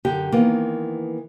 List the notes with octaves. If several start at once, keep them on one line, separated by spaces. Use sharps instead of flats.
F#2 D3 G4
D#3 E3 A#3 B3